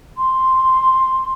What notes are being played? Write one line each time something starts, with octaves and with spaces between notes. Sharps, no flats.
C6